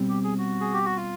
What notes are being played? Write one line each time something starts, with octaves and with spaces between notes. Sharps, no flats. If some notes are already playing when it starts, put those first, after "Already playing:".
Already playing: B2 G3 C4
G4
G#4
F#4
G#4
G4
F#4
F4